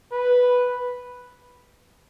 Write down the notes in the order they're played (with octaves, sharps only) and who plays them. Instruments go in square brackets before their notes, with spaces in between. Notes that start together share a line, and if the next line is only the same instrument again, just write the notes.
[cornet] B4